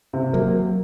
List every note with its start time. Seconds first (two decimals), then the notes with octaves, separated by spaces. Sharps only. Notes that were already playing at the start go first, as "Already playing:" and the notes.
0.13 C3
0.33 F#3 A#3